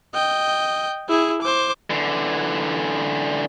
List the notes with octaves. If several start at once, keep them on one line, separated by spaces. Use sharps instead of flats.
D#5 G5
E4 G#4
C5 D6
D3 E3